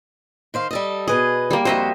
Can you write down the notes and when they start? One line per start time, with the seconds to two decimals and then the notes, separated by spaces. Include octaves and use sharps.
0.54 D#3 C5 F5
0.71 G3 A4 D#5
1.08 B2 G#4 B4 D#5
1.51 G3 A#3
1.65 F2 F#4 C5 D#5 E5